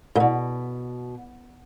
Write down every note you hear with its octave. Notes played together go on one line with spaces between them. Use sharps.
A#2
B2